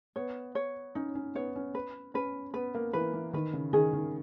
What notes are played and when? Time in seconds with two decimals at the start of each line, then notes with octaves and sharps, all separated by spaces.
0.16 B3 C#5
0.55 C#5
0.95 C#4 D#4
1.15 C#4
1.35 B3 C#5
1.56 C#4
1.75 B4
2.14 C#4 B4
2.54 B3 B4
2.75 A#3
2.93 E3 B4
3.14 E3
3.33 D#3 B4
3.53 C#3
3.73 D#3 G#4
3.93 D#3